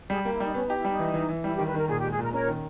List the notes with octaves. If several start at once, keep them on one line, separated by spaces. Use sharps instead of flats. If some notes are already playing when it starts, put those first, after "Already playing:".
G3 G#4
G4
A#3
E4
G3 D#4
B3 C#4
D#4
G4
E4
G3 D#4
E3
E3
E3
G3 E4
G4
D#3
B4
D#3 A#4
A#2 G#4
G4
G#3
G#4
A#2 A#4
C#4 A#4 C#5
D#3